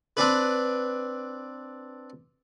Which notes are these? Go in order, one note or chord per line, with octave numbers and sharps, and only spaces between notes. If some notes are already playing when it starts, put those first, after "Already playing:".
C4 D4 B4